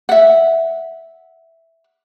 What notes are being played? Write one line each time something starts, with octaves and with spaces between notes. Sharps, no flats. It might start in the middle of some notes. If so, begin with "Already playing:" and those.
E5 F#5